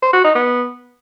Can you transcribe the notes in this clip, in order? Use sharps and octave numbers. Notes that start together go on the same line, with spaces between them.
C5
F#4
D#4
B3